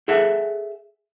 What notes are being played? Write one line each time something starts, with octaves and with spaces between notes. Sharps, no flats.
G#4 A4 E5 F#5